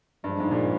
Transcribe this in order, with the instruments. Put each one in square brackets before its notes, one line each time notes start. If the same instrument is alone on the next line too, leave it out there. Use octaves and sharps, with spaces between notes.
[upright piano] G2 [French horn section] F3 G#3 D4
[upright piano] G#2
A#2